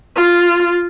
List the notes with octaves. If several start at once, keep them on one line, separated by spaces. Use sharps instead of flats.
F4